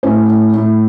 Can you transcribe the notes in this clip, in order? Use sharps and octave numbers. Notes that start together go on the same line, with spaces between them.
A2 C#4
A2
A2